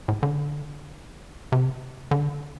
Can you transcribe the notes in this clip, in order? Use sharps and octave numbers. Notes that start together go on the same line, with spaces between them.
A2
D3
C3
D3